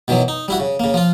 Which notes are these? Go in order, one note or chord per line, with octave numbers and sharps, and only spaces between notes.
B2 D#3 E3 F#3
D#4
G3 E4 F#4
C#3
C#3 A#3
F3 F4